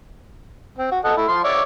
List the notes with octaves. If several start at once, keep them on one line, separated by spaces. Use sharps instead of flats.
C4
F#4
A4 D#5 F#5
A3 E4
F3 C6
C#5 D5 E5